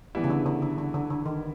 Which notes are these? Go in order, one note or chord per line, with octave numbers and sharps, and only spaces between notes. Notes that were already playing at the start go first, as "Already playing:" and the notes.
E3 G3 B3 E4
C#3
D3
D3
D3
D3
D3
D3
D#3